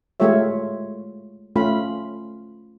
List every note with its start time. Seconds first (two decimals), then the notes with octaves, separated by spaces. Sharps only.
0.20 G#3 A3 F4 G4 C#5 E5
1.56 A3 C#4 F4 F5 B5